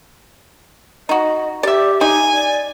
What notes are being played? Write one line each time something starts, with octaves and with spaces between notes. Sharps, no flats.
D#4 F#4 D#5
G4 D5 E5
D#4 G#5
D5